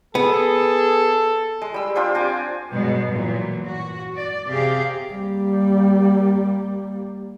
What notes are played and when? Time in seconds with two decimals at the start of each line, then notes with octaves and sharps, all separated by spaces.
0.15 B3 G#4 A4
1.62 G#3
1.74 G3 E6
1.96 D4 F4 G4 C5
2.15 C4 G#5 D6
2.73 G2 B2 F#3 G#3 B3
3.09 A#2 E3 F#3
3.66 F#4
4.17 D5
4.48 C3 G4 G#4 F5
5.13 G3 A#3